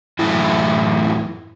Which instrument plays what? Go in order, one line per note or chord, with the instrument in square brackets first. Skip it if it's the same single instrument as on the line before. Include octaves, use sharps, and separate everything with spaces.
[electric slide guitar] F#2 A2 E3 E4